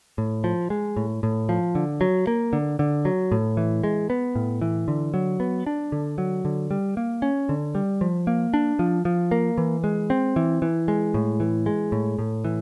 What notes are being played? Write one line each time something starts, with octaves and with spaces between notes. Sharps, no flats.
A2
F3
G#3
A2
A2
F3
D3
F#3
A#3
D3
D3
F#3
A2
E3
G#3
B3
A2
E3
D3
F#3
B3
D4
D3
F#3
D3
G3
A#3
C#4
D3
G3
F3
A#3
D4
F3
F3
A#3
E3
G#3
C4
E3
E3
G#3
A2
E3
G#3
A2
A2
E3